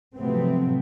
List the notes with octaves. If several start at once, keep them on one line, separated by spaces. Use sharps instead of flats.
C3 F3 F#3 A3 B3 C4